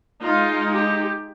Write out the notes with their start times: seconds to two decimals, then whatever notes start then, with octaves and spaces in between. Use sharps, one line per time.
0.24 G#3 D#4 F4
0.71 G4